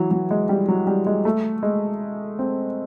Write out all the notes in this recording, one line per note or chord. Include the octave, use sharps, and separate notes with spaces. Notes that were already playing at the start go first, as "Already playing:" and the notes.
Already playing: E3 F#3
F#3
G#3
G3
F#3
G3
G#3
A3
G#3
C4